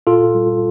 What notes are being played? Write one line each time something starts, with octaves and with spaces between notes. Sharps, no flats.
A#2 F4 A4
G3